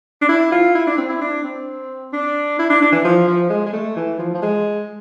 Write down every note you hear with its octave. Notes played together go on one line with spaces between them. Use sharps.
D4
E4
F4
E4
D4
C4
E4
D4
C4
D4
E4
D4
D4
E3
F3
F3
G#3
G#3
A3
E3
F3
F3
G#3